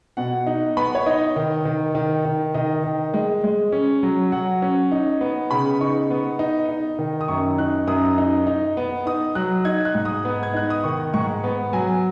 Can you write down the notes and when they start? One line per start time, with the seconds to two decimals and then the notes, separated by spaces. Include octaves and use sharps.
0.17 B2 F#5
0.47 D#4
0.77 B3 B5
0.95 C#5
1.06 D#4 D#5
1.36 D#3
1.65 D#3
1.95 D#3
2.25 D#3
2.54 D#3 D#5
2.84 D#3
3.14 G#3
3.44 G#3
3.72 C#4
4.03 F#3
4.32 F#3 F#5
4.62 C#4
4.92 D#4
5.21 B3
5.51 C#3 B5
5.81 D#4 C#6
6.11 B3
6.39 D#4
6.69 D#4
6.99 D#3
7.21 D#6
7.28 F#2 C#6
7.58 D#4 F#6
7.87 F#2 D#6
8.18 D#4
8.47 D#4
8.77 B3
9.06 D#4 D#6
9.35 F#3 F#6
9.65 D#4 G#6
9.85 F#6
9.95 G#2
10.05 D#6
10.25 B3
10.43 G#6
10.54 D#4 F#6
10.70 D#6
10.83 D#3 C#6
11.14 G#2 C#6
11.44 B3
11.73 F#3 G#5